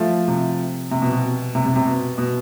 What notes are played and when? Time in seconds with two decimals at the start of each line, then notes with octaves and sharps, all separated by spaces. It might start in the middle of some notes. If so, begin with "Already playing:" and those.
Already playing: F3 A3
0.28 C3
0.91 C3
1.02 B2
1.12 B2
1.55 C3
1.65 C3
1.76 C3
1.87 B2
2.18 B2